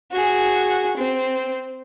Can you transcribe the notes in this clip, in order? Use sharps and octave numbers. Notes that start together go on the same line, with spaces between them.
F#4 G#4
C4